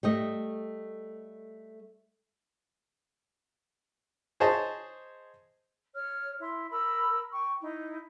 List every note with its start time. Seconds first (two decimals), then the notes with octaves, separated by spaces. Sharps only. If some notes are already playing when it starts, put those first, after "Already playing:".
0.03 G3 A3 D#5
4.40 G#4 C5 C#5 D#5 A5
5.94 C#5 F6
6.41 E4 C6
6.71 A#4 B5 E6
7.31 G5 C#6
7.62 D#4 E4